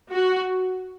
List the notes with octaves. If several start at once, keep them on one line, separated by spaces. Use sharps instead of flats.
F#4